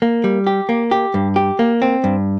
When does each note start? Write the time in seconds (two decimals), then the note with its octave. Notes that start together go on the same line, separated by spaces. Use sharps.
0.02 A#3
0.24 G3
0.47 G4
0.69 A#3
0.91 G4
1.14 G2
1.36 G4
1.59 A#3
1.82 C4
2.04 G2